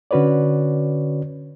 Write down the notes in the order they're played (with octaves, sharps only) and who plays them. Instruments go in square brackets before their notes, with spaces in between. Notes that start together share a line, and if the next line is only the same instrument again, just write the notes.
[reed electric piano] D3 C#4 F#4 B4 C#5 D5